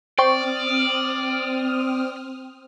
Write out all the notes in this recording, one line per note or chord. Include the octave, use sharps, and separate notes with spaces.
C4 C5 D5 G5 C#6 D#6 F6